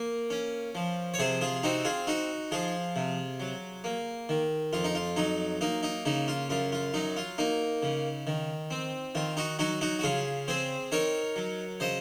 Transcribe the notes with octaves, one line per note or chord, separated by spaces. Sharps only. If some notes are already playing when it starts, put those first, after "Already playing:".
Already playing: A#3 A#4
C#4
F3
C#5
C3 G#4 C5
F4 G#4
C4 D#4 F#4
F4 G#4
D#4 F#4
F3 F4 G#4
C3
F#3
A#3
D#3
F2 F4
D#4
F4
F#3 D#4
A#3 D#4
D#4
C#3 D#4
F4
F#2 F4
F4
F#3 D#4
F4
A#3 D#4
C#3
D#3
C4
D#3 F4
D#4 F#4
F#3 D#4 F#4
D#4 F#4
F#4
C#3 F4 G#4
C4 G#4 C5
D#4 A#4 C#5
F#3
C#3 C5 D#5